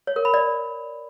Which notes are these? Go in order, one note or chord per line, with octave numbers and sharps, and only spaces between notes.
C#5
A#4
B5
D5